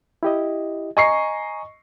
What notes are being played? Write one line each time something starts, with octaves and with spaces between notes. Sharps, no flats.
E4 G4 D#5
D#5 G#5 A#5 C#6 C7